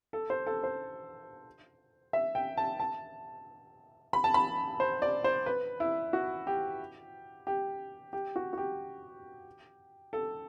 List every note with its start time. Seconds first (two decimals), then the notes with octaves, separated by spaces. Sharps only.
0.13 A4
0.30 C5
0.47 A4
0.63 C5
2.13 E5
2.35 G5
2.57 A5
2.80 A5
4.13 B5
4.24 A5
4.34 B5
4.80 C5
5.02 D5
5.24 C5
5.46 B4
5.80 E4
6.13 F#4
6.47 G4
7.47 G4
8.13 G4
8.36 F#4
8.53 F#4
8.58 G4
10.13 A4